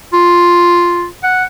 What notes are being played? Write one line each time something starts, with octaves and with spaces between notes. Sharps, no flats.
F4
F#5